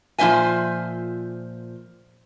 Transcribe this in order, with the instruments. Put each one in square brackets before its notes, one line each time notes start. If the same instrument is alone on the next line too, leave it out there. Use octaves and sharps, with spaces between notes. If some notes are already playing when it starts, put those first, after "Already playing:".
[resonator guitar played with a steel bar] A#2 F3 A#3 C5 E5 G#5